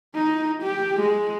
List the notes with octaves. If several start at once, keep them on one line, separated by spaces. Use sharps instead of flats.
D#4
G4
G#3